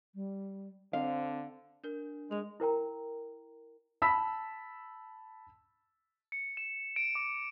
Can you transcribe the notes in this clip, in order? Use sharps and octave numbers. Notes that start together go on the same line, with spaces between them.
G3
D3 C4 F5
D4 A#4 G6
G#3 G#4 F7
E4 A#4 G5 A#5
A5 B5 E6 B6
C#7
E7
D7
D6